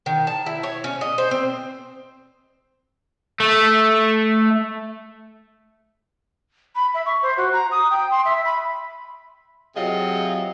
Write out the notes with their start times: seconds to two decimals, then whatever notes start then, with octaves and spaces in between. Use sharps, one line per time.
0.06 D#3
0.27 A5
0.46 E4
0.63 C#5
0.84 C#4
1.01 D#5
1.18 C5
1.31 C4
3.40 A3
6.75 B5
6.94 E5
7.06 C#6
7.22 C5
7.37 F#4
7.53 A#5
7.71 D#6
7.90 G5
8.11 C6
8.25 E5
8.45 B5
9.76 C3 F#3 F4 G#4 D#5